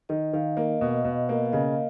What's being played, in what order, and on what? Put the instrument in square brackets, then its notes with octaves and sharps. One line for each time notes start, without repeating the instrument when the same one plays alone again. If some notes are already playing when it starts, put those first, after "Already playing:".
[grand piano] D#3 [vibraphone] D#5
[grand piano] D#3 [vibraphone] F5
[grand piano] A#3 [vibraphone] D#5
[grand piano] B2
B2
A#3
[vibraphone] F5
[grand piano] C#3 [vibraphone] D#5